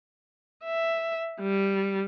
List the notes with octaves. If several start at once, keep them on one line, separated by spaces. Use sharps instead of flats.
E5
G3